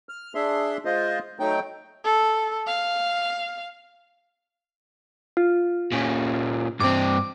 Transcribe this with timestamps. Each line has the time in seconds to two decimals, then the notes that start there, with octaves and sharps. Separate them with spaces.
0.09 F6
0.35 D4 G#4 E5 C6
0.85 G#3 F4 C5 D#5
1.40 F#3 A3 D#4 G5
2.04 A4
2.67 F5
5.37 F4
5.92 A#2 C#4
6.80 G2 C4 D6